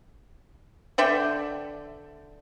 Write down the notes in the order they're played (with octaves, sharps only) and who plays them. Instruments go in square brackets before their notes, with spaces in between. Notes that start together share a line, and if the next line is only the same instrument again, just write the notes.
[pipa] D3 D5 E5 G5